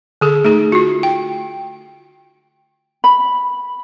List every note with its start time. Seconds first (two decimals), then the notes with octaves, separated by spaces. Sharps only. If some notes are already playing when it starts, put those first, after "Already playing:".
0.21 D3 G#4 A4
0.45 A3 D#4 G#4
0.72 F4 F#4
1.03 G5
3.04 B5